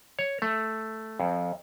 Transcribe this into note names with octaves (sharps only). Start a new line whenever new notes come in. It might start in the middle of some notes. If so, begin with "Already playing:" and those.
C#5
A3
F2